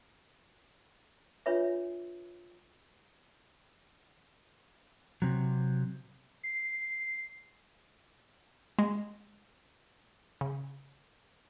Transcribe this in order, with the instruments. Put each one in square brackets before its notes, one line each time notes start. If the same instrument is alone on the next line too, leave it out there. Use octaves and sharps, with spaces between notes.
[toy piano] D4 F4 B4 C#5 E5
[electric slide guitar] C3 F#3
[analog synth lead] C7
[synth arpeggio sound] G#3
C#3